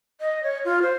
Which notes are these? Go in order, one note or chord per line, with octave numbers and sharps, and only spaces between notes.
D#5
C#5
F4
C5